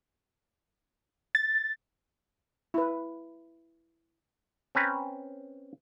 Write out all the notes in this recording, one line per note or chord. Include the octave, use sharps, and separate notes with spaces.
A6
E4 B4
C4 C#4 B4 A#5